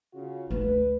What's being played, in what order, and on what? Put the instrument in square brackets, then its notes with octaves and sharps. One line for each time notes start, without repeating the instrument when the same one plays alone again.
[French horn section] C#3 F4 F#4
[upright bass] D2 A3 [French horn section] B4